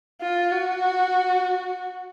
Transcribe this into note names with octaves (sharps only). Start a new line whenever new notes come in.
F4
F#4